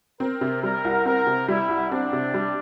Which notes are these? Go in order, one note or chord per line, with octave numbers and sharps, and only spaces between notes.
C4 A#4
C3
G3 A#4
C2
C4 A#4
C3
G3 E4
C2
C4 D4
C3
G3